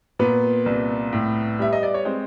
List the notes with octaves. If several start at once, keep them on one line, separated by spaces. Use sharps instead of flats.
A#2 B3 B4
C2
A2
G3 E5
D#5
D5
C#5
G#3 C4 C5